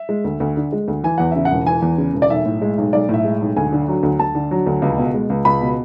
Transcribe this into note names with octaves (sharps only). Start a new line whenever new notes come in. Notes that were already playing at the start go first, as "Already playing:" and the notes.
Already playing: E5
G#3
D2
D2
D3
G#3
D2
E3 G#5
E2 F#5
C#3 E5
F#5
E1
E3 G#5
E2
C#3
E1
D5
B1 E5
A2
G#3
B1
B1 D5
A2 E5
G#3
B1
D2 G#5
D3
F#3
D2
D2 A5
D3
F#3
D2
C#2
B2
G#3
C#2
C#2 B5
B2